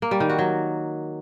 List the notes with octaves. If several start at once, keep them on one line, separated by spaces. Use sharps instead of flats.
A#3
G3
D#3
F#4
F#3